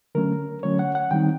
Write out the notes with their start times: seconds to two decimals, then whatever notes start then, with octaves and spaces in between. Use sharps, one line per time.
0.15 D3 F#3 A3 C#4 A#4
0.63 D3 F#3 A3 C#4 C#5
0.79 F#5
0.95 F#5
1.11 D#3 G3 C4 D#4 G5